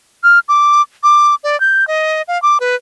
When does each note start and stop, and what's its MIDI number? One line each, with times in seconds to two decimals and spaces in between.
0.24 0.39 89
0.49 0.82 86
1.03 1.35 86
1.44 1.59 74
1.60 1.87 91
1.88 2.22 75
2.28 2.40 77
2.42 2.58 86
2.60 2.76 71